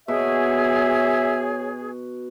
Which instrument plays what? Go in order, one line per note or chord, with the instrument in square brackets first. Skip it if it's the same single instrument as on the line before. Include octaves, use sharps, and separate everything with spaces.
[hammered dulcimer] B2 [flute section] G#4 [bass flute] C#5 [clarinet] E5